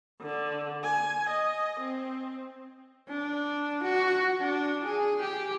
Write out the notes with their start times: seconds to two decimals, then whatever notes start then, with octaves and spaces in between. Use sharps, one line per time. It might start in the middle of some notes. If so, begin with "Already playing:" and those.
0.21 D3
0.84 G#5
1.30 D#5
1.80 C4
3.08 D4
3.83 F#4
4.40 D4
4.84 G#4
5.21 G4